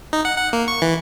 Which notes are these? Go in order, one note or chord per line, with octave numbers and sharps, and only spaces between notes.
D#4
F#5
F#5
A#3
C#6
E3